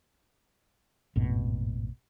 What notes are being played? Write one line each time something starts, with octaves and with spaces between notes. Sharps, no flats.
A1 F2 G#2 B2